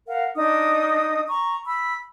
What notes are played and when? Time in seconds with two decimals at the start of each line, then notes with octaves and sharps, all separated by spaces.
0.08 A#4 F5 F#5
0.36 D4 D#4 D#6
1.28 A#5 C#6
1.66 B5 E6